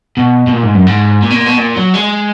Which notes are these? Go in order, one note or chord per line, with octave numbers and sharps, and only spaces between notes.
B2
B2
A#2
G#2
F#2
G#2
A#2
B2
A#2
B2
A#2
F#3
G#3